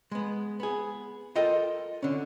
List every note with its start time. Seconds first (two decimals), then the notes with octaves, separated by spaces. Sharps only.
0.12 G#3 B3
0.60 B3 G#4
1.36 F4 A4 A#4 D#5 G5
2.03 D3 C#4